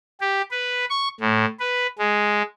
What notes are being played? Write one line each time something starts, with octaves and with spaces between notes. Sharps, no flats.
G4
B4
C#6
A2
B4
G#3